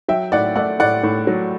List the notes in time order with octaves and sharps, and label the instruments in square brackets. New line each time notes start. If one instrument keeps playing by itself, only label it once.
[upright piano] F#3 E5 G5
A2 D5 F#5
A3 D5 F#5
A2 D5 F#5
A2
F#3